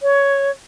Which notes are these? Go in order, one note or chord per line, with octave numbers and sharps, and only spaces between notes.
C#5